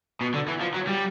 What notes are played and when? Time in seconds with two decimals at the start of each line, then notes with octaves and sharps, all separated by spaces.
0.21 B2
0.34 D3
0.48 E3
0.61 F3
0.74 F#3
0.87 G3